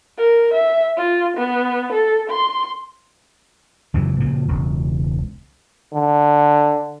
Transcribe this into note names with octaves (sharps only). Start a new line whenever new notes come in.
A#4
E5
F4
B3
A4
C6
C#2 F#2 C#3 E3
A#2 C#3 F3
E1 C#2
D3